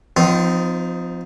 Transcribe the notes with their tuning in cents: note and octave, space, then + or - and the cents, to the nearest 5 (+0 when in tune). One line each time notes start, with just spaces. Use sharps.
F3 +0 C4 -45 D#4 +0